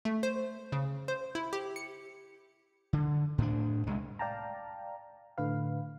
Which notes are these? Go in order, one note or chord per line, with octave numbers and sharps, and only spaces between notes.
A3
C5
C#3
C5
E4
G4
C#7
D3
A2 D4
C2 G#3
D5 F5 G5 A5 A#5
A2 D3 B4 F5